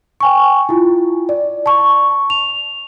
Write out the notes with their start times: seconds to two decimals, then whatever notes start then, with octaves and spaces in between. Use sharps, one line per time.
0.20 G5 G#5 C#6
0.69 E4 F4
1.29 D5
1.66 A5 C#6
2.30 F7